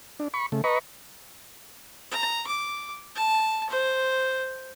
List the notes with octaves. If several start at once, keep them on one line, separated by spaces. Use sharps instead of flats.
D4
B5 C#6
C#3 A3
B4 D#5 A#5 B5 C#6
A#5
D6
A5
C5